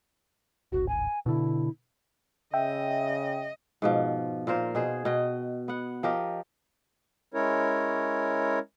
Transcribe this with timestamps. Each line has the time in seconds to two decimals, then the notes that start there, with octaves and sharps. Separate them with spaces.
0.72 D1 G#1 F#4
0.88 G#5
1.26 B2 D3 E4
2.53 C#3 D#5 E5 G5
3.82 G#2 B2 F3
4.47 A#2 F4 A#4 C5
4.75 B2 G#4 C5
5.05 B2 D#5 G5
5.68 B3 F#5
6.03 F3 G4 A#4 D#5
7.34 G#3 C#4 E4 A#4 C#5